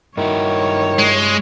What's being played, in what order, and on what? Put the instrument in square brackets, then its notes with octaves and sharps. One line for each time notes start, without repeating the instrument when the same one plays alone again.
[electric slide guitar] G2 E4 F#4 [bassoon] D#3 [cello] C#5
[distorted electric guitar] G#3